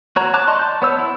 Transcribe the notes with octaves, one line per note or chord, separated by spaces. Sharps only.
F#4 C#5 A#5
A5 A#5 D6 F#6
D5 D#5 A5 C6 C#6
A5 G6
B3 C#5 E6
E4